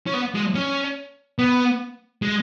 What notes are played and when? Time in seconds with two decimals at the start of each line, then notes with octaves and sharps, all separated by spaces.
0.07 C#4
0.13 B3
0.35 G#3
0.55 C#4
1.39 B3
2.22 G#3